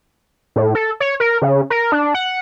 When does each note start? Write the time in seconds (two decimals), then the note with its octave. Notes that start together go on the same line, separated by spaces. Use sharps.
0.56 A2
0.75 A4
1.00 C#5
1.20 A#4
1.42 C#3
1.70 A#4
1.92 D4
2.15 F#5